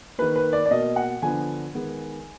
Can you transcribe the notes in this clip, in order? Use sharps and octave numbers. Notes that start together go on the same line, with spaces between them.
D#3 A#3 B4
B4
D5
D5
B2 A#3 D#5
F#5
D3 F3 B3 G#5
D#3 G#3 B3